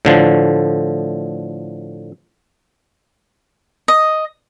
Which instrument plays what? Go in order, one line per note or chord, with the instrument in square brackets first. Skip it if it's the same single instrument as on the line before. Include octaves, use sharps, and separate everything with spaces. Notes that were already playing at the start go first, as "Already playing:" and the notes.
[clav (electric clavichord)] A2 D3 F3
[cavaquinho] D#5